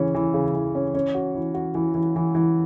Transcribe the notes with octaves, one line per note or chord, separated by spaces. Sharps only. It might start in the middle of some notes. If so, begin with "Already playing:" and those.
Already playing: C#3 E3 C#4
E3
C#3
E3
C#4
C#4
F#4
E3
F#4
E3
E3
E3
E3